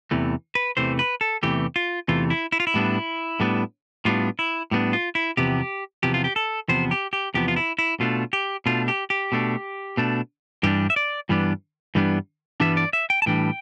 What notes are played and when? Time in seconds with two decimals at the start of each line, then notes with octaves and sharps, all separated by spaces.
0.11 E2 C3 E3 A3
0.55 B4
0.77 E2 C3 E3 A3 C5
0.99 B4
1.21 A4
1.43 E2 C3 E3 A3 G4
1.76 F4
2.08 E2 C3 E3 A3 F4
2.30 E4
2.52 E4
2.60 F4
2.67 E4
2.74 A2 G3 B3 D4
3.40 A2 G3 B3 D4
4.05 A2 G3 B3 D4 F4
4.39 E4
4.71 A2 G3 B3 D4
4.93 F4
5.15 E4
5.37 E2 C3 F3 B3 G4
6.03 E2 C3 F3 B3 G4
6.14 F4
6.24 G4
6.36 A4
6.68 E2 C3 F3 B3 C5
6.91 G4
7.13 G4
7.34 E2 C3 F3 B3 G4
7.48 F4
7.56 E4
7.79 E4
8.00 B2 A3 D4 F4
8.33 G4
8.66 B2 A3 D4 F4
8.88 G4
9.10 G4
9.32 B2 A3 D4
9.97 B2 A3 D4
10.63 G2 E3 G3 B3 D4 G4
10.90 E5
10.96 D5
11.29 G2 E3 G3 B3 D4
11.95 G2 E3 G3 B3 D4
12.60 G2 E3 G3 B3 D4 E5
12.77 D5
12.93 E5
13.10 G5
13.22 A5
13.26 A2 E3 G3 D4 G5